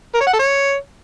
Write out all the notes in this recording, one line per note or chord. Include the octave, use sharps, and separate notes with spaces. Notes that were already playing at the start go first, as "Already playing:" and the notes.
A#4
C#5
F#5
A4
C#5